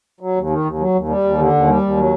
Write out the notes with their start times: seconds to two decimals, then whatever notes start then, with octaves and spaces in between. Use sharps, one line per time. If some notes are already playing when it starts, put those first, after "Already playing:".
0.21 F#3
0.36 D#2
0.50 D#3
0.65 D#2
0.79 F#3
0.95 D#2
1.08 G3
1.24 D#2
1.38 D3
1.53 D#2
1.67 G3
1.82 D#2
1.97 F#3